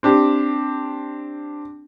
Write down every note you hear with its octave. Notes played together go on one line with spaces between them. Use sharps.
C4 D4 G4